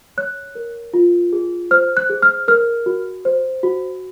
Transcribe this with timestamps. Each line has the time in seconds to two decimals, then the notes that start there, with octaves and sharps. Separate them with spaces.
0.18 C#5 F#6
0.55 A#4
0.94 F4
1.33 G#4
1.71 C5 F6
1.97 F#6
2.10 G#4
2.22 F6
2.48 A#4 F6
2.86 F#4
3.25 C5
3.63 F#4